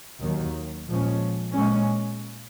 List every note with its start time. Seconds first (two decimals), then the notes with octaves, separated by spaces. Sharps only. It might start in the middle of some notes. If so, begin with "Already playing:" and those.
0.20 D#2 D#3 F#3
0.87 A#2 F3 G#3 C#4
1.54 A#2 G#3 C#4